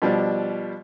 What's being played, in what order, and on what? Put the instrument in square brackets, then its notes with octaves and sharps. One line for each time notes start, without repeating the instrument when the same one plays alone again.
[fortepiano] B2 F3 G3 D4